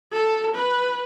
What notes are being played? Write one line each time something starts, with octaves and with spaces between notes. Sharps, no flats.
A4
B4